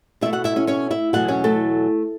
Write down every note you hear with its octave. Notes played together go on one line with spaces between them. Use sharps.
B2 F#3 A3 E4 E5
F#4 F#5
E4 E5
C#4 C#5
C#4 C#5
E4 E5
E2 B2 F#3 A3 F#4 F#5
C#4 C#5
A3 A4